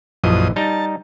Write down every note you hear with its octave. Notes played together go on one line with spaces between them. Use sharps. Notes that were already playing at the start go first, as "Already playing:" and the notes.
A#1 F#2 E3 F3 D#5 D#6
G3 D#4 A5 A#5